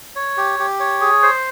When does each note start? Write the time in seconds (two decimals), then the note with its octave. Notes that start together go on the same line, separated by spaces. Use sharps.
0.16 C#5
0.37 G4
0.59 G4
0.80 C#5
1.01 G#4
1.22 C5